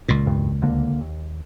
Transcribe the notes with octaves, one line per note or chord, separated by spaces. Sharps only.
C#2 A#2
E1 G2
D2 D3 A#3
D#2